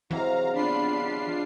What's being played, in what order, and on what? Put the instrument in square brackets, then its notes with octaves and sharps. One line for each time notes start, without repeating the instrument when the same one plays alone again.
[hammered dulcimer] C3 F#3 G#3 [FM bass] E3 [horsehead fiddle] F#4 [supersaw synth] F5 A#5
[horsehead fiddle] B3 B5 [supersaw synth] D4 F4 C7